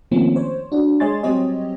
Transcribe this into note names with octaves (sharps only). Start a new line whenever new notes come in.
D#3 F3 A3 A#3 C4 C#4
C5 C#5
D4 F#4
G#3 C#5 D#5 G#5 C6 A6
F#3 G3 C4 G4 C#5 D#5